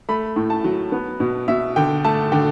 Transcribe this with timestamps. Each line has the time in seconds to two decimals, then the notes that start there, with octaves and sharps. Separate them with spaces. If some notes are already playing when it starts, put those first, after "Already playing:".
0.09 A3 B5
0.36 A2
0.50 A5
0.64 F#3
0.92 B3
1.20 B2
1.48 B2 E5
1.76 D3 G5
2.04 A3 A5
2.32 D3 G5